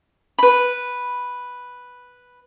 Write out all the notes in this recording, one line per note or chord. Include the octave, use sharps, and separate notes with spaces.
B4 B5